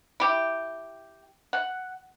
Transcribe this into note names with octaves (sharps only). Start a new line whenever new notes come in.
E4 G4
F#5